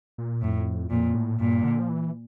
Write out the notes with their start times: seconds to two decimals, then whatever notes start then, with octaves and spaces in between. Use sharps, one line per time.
0.18 A#2
0.42 F2 A2
0.91 F2 A#2
1.15 A2
1.40 G2 A#2
1.64 D3
1.79 F3
1.89 E3